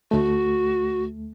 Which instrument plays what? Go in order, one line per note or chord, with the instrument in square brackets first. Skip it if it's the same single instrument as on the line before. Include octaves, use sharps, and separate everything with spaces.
[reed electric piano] D2 A3 [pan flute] F#4